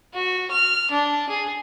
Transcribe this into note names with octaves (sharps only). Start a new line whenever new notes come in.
F#4
F6
D4
G#4